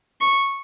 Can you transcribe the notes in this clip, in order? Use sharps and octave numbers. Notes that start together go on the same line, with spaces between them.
C#6